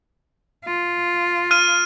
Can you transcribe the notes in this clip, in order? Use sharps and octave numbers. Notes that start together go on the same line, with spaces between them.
F4
F6 D#7